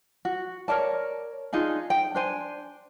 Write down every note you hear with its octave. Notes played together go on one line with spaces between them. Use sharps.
F#4
A#4 C#5 D5 A5
D4 D#4 F4 G#4
G5
D4 C5 G#5